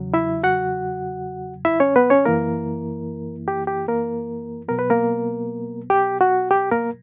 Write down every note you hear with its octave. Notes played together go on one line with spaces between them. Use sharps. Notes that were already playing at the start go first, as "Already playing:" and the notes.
Already playing: E2 C#3 F#3
E4 E5
F#4 F#5
E4 E5
C#4 C#5
B3 B4
C#4 C#5
F#2 E3 A#3 E4 A#4
G4
G4
A#3 A#4
B2 F#3 B3 A#4
B4
A#3 A#4
G4
F#4
G4
A#3 A#4